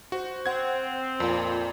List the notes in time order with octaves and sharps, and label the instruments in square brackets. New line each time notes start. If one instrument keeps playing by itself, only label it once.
[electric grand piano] F#4 [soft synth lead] C5
[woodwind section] C4 [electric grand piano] F#5 G#6
[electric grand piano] F2 [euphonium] A#2 [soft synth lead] F4